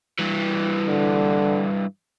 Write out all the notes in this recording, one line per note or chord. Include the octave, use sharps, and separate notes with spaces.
G2 E3
D3